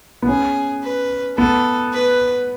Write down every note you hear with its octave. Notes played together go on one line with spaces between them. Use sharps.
B3
C#4 G#4
B4
B3 A4
B4